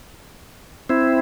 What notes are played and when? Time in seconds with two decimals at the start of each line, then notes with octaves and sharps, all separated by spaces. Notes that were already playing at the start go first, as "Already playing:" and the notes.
0.89 C4 E4